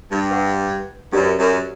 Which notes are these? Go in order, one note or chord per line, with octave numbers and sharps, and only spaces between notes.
G2
B4 F#5 C#6
F#2 C#4 G4 B4 D5
F#2